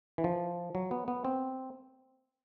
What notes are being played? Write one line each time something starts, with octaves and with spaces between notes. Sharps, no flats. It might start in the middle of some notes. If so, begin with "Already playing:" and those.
E3
F3
F#3
B3
B3
C4